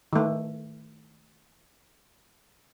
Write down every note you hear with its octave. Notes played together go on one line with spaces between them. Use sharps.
D#3 A3